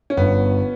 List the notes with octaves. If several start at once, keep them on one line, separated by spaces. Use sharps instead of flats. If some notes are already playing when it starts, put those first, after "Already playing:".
C#4
G1 B3